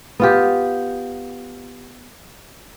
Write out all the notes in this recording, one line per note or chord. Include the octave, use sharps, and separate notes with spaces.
B3 F4 G4